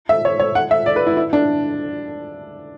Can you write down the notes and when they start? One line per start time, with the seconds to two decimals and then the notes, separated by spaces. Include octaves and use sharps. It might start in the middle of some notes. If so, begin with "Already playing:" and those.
0.09 E5
0.25 C#5
0.40 C#5
0.55 F#5
0.71 E5
0.86 D5
0.96 B4
1.07 E4
1.17 E4
1.33 D4